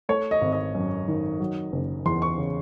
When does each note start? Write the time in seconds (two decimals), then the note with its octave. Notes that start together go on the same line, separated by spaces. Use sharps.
0.09 A3 C#5
0.31 D#5
0.41 G#1
0.52 D#5
0.75 F#2
1.08 D#3
1.40 F#3
1.72 F#1
2.06 E2 C6
2.22 C#6
2.38 C#3